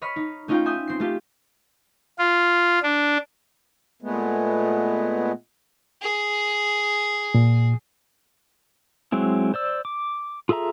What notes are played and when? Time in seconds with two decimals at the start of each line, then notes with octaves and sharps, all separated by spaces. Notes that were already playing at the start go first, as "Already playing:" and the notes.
0.02 C#5 D#5 B5 F6 B6
0.16 D#4
0.48 A3 C#4 D#4 F4 G5
0.65 E5 G#5 D#6 G6
0.87 C4 C7
1.00 A3 C4 F4 G4
2.18 F4
2.83 D4
4.02 A#2 G#3 A3 B3
6.02 G#4
7.34 A#2
9.12 F#3 G#3 C4 E4
9.54 C5 D5 E6
9.85 D6
10.49 F4 G#4 A4 E5 A#5